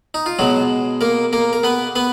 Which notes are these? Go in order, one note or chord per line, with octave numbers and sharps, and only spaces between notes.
D#4
F4
B2 F#3 G#3 F#4
A#3 A#4
A#3 A#4
A#4
B3 B4
B3 B4